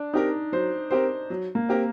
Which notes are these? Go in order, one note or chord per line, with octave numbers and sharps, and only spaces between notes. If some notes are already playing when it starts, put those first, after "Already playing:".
Already playing: D4
C4 D#4 G4 A#4
F#3 C5
C4 G4 A#4 C5
F#3
A#3
C4 G4 A#4